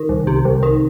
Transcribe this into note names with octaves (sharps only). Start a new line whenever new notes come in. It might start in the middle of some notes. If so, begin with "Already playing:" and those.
Already playing: D#3
C2
C3
C2
D#3